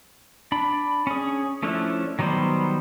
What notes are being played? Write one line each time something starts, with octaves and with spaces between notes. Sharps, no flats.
D4 B5
C#4 G#4
F3 A3 C#4 D4 E4
D#3 F#3 G3 B3 C5